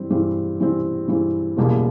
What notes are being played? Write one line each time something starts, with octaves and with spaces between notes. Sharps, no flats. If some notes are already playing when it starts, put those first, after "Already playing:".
Already playing: G2 E3 G3 C4
G2 E3 G3 C4
G2 E3 G3 C4
G2 E3 G3 C4
F#1 E2 B2 G3 A#3